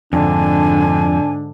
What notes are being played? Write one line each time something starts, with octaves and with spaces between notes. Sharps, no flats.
F2 G#2 D3 D4 G#5